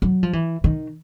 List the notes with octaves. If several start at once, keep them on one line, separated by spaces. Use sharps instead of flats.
F#3
F3
E3
D#3